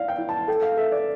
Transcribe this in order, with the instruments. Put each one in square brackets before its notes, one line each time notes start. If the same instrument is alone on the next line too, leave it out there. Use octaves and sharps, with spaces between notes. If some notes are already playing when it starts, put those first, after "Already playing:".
Already playing: [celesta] E4 D5 [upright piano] F5
[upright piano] G5
[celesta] E4
[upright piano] A5
[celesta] A4 [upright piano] G5
[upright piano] F5
[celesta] A4 [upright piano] E5
[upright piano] D5